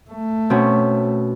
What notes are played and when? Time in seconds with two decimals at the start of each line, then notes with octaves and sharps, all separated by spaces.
0.10 A3
0.50 B2 C4 C#4